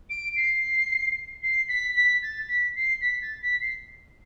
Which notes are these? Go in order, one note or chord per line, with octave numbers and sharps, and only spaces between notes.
D7
C7
C7
B6
B6
A6
B6
C7
B6
A6
B6
C7